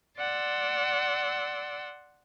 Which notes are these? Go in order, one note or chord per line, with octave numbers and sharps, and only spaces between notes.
D5 F#5 C6 E6